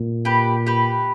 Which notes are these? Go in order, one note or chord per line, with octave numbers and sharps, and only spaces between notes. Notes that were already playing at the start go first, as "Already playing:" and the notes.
Already playing: A#2
G4 B4
G4 B4